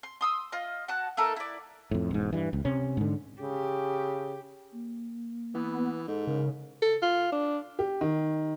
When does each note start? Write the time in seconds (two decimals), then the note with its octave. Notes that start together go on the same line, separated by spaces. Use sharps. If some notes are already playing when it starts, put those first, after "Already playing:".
0.03 C6
0.21 C6 D#6 E6
0.52 F4 D#5
0.88 F#4 F#5 A5 F#6
1.17 A3 D#4 A4 A#4
1.36 E4 D5
1.91 F2 A2
2.11 E1 G#2
2.33 G2 E3
2.53 C#2
2.65 C3 C#4
2.97 G#2 D3
3.41 C#3 G4
4.72 A#3
5.55 E3 B3
6.08 G#2 A4
6.27 C#3 A#4
6.82 A4
7.02 F4
7.32 D4
7.79 G4
8.01 D#3